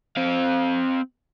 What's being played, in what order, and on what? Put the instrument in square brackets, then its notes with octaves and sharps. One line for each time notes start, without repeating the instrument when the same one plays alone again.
[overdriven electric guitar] C4 F5